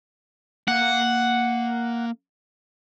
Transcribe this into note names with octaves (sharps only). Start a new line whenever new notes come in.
A#3 F5 F#5